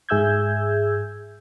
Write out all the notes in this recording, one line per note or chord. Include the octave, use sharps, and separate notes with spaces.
G#2 G#4 E5 E6 G6 G#6